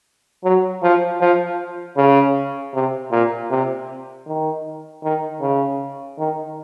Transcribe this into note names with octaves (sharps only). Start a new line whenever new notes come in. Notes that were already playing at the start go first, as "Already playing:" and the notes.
F#3
F3
F3
C#3
C3
A#2
C3
D#3
D#3
C#3
D#3